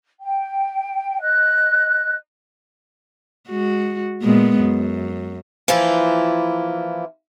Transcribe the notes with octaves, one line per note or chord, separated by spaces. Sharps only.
G5
D#5 F#6
G#3 F#4
A#2 G#3 B3
F#2
E3 F3 A#3 E4 F4